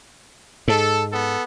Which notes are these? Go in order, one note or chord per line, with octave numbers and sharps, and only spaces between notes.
G#2 A4
B3 A4